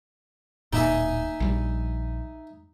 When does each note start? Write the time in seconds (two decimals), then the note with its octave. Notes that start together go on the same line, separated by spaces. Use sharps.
0.73 D1 A#2 D#4 E5 G#5
1.40 A#1 G3